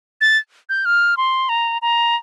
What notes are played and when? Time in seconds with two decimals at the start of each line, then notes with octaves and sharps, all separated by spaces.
0.21 A6
0.69 G6
0.85 F6
1.17 C6
1.49 A#5
1.82 A#5